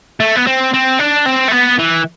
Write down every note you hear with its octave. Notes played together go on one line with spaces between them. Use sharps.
A3
B3
C4
C4
D4
C4
A3
B3
E3